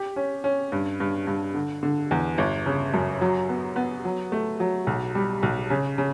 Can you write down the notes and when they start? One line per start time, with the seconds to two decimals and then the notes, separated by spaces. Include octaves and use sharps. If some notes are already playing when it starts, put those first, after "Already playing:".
Already playing: G4
0.16 C#4
0.44 C#4
0.72 G2
1.00 G2
1.27 G2
1.54 D3
1.83 D3
2.11 E2
2.38 G1
2.66 C#3
2.94 F#2
3.21 F#3
3.49 B3
3.76 B3
4.05 F#3
4.32 A3
4.60 F#3
4.87 B1
5.15 G3
5.43 B1
5.70 C#3
5.98 C#3